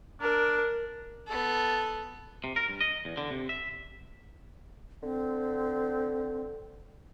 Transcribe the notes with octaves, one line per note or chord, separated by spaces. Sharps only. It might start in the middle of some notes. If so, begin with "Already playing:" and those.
D4 A#4
B3 A4
C3
A#4
G2
D#5
E2
D3
C3
E5
D3 C4